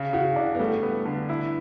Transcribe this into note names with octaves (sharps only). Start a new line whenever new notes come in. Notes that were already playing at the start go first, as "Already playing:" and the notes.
Already playing: C#3
C#3 F#4
D4 E4
B3
G3 A3
B3
D3
E4